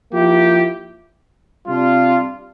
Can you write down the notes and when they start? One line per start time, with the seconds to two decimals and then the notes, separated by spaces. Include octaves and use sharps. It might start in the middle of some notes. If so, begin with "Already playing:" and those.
0.12 F3 A#3 E4 G4
1.67 C3 G3 D4 F4